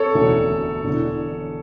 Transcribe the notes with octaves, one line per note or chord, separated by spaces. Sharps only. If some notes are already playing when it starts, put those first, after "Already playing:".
Already playing: A4 C#5
E1 D2 D3 A3 C#4
E1 E2 D3